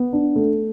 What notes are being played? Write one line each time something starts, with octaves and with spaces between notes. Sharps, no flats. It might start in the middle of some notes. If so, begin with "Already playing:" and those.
Already playing: B3
D4
A3